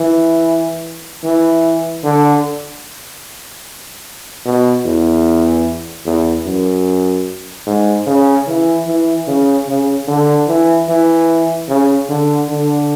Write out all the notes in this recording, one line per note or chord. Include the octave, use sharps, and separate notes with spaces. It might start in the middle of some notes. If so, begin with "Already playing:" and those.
Already playing: E3
E3
D3
B2
E2
E2
F#2
G#2
C#3
E3
E3
C#3
C#3
D3
E3
E3
C#3
D3
D3